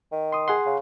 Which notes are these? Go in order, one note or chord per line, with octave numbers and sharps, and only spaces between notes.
D#3
C6 D#6
G#4 F#5 C6
C#3